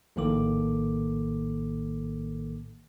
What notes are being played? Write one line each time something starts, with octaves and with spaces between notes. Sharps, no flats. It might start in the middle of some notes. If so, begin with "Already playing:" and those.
A#1 A2 D#3 A#3 A4 D6